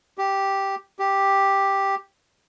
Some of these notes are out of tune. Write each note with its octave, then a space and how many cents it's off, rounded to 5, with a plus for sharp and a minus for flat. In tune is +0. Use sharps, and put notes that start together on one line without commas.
G4 -5
G4 +0